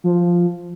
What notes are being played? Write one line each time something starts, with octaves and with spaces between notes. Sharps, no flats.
F3